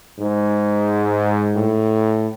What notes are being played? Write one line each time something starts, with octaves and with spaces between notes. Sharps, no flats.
G#2
A2